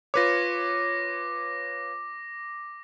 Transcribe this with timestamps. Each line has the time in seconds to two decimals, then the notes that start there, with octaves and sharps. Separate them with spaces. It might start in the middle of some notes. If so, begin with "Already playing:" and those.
0.14 F4 B4 C#5 D6 A#6